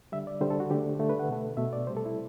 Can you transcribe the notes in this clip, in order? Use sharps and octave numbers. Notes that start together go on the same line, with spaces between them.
D3 G3 E5
D5
D3 G3 C5
A4
F#4
D3 A3 G4
D3 A3 A4
B4
F#5
B2 A3
B2 A3 E5
D5
C3 G3 C5
A4
E4